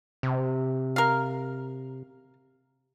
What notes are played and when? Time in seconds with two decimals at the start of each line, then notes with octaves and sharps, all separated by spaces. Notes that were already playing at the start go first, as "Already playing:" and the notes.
0.23 C3
0.96 A#4 F5